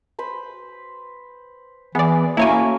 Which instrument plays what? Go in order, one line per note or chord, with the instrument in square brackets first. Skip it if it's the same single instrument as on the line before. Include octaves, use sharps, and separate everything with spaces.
[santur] B4 C5 B5
[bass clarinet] E3 [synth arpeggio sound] B3 D5 [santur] G#4 E5
[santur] A3 C#4 F#4 [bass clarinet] A#3 [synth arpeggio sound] E4 C#5 G#5